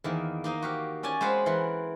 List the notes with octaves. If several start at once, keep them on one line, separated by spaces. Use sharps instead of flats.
E2 D#3 A#3
A#3 D#4 D#5 F5
F#4 G4 F5
C#4 D5 G#5 A5
G#3 C4 C5 F5 F#5 B5
E3 A#4 F#5 C6